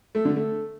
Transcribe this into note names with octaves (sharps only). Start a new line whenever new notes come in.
A3
D3
A3